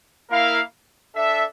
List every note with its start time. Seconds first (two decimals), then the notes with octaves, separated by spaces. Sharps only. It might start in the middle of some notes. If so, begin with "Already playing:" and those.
0.29 A#3 E4 A#4 F5
1.15 D4 A4 E5